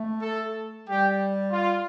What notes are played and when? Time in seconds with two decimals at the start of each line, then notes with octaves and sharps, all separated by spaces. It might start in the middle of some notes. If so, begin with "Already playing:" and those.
Already playing: A3
0.22 A4
0.88 G3 G4
1.52 F4